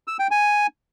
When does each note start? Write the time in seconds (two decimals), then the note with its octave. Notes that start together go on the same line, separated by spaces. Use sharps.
0.07 E6
0.19 G5
0.31 G#5